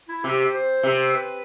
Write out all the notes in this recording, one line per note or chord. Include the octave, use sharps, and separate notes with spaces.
E4
C3 G4
C5
C3
B4